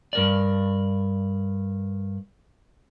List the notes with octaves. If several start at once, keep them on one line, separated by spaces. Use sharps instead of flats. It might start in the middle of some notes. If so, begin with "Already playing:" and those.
G2 A#4 D5